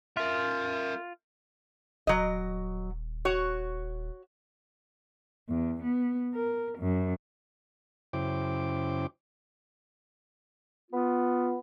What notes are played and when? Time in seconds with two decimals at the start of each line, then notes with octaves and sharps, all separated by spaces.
0.17 F4 A#4 E5
2.07 D#1 F#3 D#5
3.25 F#4 C#5
5.49 E2
5.83 B3
6.33 A#4
6.78 F#2
8.13 F#2 C#3 E4 C5 G5 D6
10.90 B3 F4